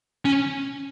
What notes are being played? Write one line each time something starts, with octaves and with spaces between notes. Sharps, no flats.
C#4